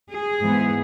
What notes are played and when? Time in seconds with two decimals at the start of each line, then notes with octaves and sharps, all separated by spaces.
0.11 G#4
0.41 G#2 E3 B3